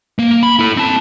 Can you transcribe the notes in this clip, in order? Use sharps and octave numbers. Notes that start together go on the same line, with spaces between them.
A#3
B5
E4 A4
C4 A5